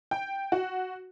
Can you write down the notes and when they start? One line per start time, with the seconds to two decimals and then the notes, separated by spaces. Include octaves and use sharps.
0.11 G5
0.52 F#4